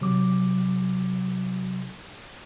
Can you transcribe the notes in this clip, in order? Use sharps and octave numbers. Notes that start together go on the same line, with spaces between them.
C3 F#3 D6